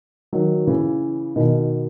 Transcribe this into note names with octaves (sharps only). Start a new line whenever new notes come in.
D#3 F#3
C#3 E3
B2 D#3